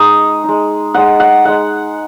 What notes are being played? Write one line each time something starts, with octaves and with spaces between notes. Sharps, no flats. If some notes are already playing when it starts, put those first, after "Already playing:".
Already playing: G#3 D#4 D#6
G#3 D#4
G#3 D#4 F#5
F#5
G#3 D#4 F#5